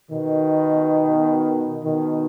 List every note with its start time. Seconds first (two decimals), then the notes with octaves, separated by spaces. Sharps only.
0.11 B2 D#3
1.85 B2 D#3